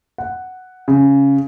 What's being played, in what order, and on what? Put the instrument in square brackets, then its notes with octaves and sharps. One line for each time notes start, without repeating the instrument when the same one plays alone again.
[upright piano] F#5
C#3